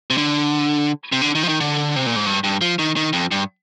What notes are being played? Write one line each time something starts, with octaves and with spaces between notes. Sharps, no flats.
C3
D3
C3
D3
D#3
F3
D#3
D3
C3
A#2
G#2
G2
G2
F3
D#3
D#3
F2
G2